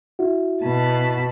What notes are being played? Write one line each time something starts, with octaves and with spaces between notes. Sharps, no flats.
E4 F#4
B2 A5 B5